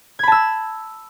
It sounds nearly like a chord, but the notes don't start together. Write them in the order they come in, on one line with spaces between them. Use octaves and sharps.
G#6 B5 A5 E6